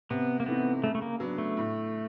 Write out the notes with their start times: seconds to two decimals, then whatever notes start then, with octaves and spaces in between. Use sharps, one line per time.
0.10 C3 B3
0.40 A#3
0.46 E3 A3 B3 C4 D#4
0.83 C#3 A3
0.95 A3
1.02 A#3
1.20 F#3 B3 D4
1.38 A3
1.57 A2